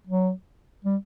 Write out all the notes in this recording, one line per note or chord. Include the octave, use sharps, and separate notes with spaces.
F#3
G3